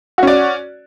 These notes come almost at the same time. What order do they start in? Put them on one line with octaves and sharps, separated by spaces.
F#4 C#4 D5